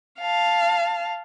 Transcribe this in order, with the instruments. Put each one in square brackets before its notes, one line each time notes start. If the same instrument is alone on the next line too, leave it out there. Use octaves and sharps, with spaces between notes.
[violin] F5 A5